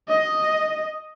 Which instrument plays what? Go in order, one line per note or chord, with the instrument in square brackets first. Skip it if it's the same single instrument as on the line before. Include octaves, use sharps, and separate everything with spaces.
[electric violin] D#5